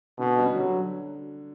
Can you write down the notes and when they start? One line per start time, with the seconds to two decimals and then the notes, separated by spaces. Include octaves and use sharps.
0.19 B2 D3
0.37 G3 C#4 F#4
0.55 D3 F#3